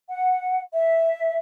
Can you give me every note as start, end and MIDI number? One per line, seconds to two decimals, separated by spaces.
0.09 0.61 78
0.73 1.38 76